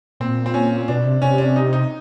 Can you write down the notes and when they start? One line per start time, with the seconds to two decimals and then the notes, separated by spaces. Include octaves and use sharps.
0.20 A#2 C4
0.46 C4
0.54 C#4
0.88 B2 D4
1.05 C3
1.22 C3 C#4
1.38 D4
1.56 D#4
1.73 D#4